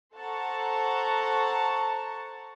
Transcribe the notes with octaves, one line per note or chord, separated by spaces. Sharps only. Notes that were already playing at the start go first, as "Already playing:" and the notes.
A4 C5 F#5 A5 A#5 C#6